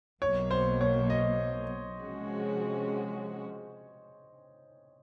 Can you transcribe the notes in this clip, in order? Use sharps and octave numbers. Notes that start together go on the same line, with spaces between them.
B1 B2 F#3 A#3 C#5
C5
C#5
D#5
C3 F3 G#3 C#4 F#4